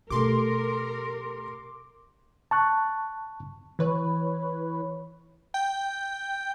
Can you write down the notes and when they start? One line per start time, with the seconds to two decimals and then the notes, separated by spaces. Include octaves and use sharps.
0.10 B2 A3 G4 A#4 C6 D6
2.51 A5 C#6 F#6
3.79 E3 B4 C#5
5.54 G5